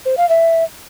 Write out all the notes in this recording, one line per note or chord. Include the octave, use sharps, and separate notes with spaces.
C5
F5
E5